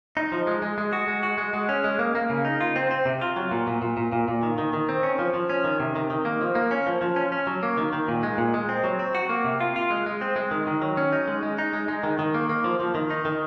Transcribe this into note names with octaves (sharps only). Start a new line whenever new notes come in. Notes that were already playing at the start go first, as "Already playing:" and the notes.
D#4
F3
G#3
G#3
G#3
F#4
G#3
F#4
G#3
G#3
C#4
G#3
A#3
A#3
C#3
D#4
F4
C4
C4
C3
F4
F#3
A#2
A#2
A#2
A#2
A#2
A#2
D#3
D#3
D#3
C4
C#4
F3
F3
C#4
D#3
C3
D#3
D#3
A#3
F3
A#3
C#4
F3
F3
C#4
C#4
F#3
A#3
D#3
D#3
A#2
G#3
A#2
G#3
C4
F#3
C4
F#4
A#3
C3
F4
F4
G#3
G#3
C4
G#3
D#3
D#3
F#3
C#4
D#4
G#3
G#3
D#4
G#3
G#3
D#3
D#3
A#3
A#3
F3
F3
D#3
D#4
D#3